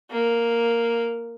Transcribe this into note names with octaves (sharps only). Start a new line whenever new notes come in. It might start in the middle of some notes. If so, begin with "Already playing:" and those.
A#3